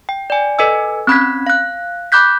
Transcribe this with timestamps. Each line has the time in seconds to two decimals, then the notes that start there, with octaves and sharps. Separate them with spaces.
0.09 G5
0.30 D5 G#5
0.59 A4 B4 D#5 G#5 E6
1.07 C4 C#4 B5 F#6 G#6 B6
1.47 F5 F#6
2.12 B5 D6 F#6 G6 B6